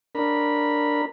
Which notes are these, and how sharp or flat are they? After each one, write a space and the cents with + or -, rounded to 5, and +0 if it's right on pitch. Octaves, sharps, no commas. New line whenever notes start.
D4 +0 A#4 -10 B5 -10